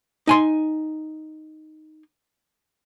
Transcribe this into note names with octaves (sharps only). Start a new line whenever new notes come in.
D#4 G#5 C6